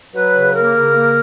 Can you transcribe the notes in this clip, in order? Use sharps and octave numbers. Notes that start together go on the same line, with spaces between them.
F#3 B4
C#3
A#3 A#4
C#3
A#3